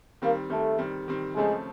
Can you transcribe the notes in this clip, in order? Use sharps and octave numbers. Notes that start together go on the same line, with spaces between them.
D#3 G3 A#3 C4
D#3 G3 A3 C4
D#3 G3 C4
D#3 G3 C4
C#3 F3 G#3 A3 C4